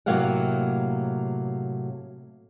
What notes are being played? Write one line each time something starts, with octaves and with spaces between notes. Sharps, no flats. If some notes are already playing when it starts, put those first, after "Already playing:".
A2 C3 F#3 A#3 F5 F#5